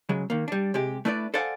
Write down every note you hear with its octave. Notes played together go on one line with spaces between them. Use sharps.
C#3 F#3 G#3
D#3 A#3
G3 D4
C3 G#3 G4
A3 D4 E4 B4 C#5 D5
A4 C5 D5 F5 F#5 G#5